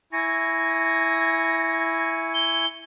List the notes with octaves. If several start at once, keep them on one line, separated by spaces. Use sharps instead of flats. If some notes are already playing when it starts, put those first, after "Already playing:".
E4 G#5 C#6 A#6
G7